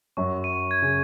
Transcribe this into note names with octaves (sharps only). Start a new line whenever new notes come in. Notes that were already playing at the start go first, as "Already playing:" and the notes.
F#2 F#3 C#6
D#7
G#6
C#3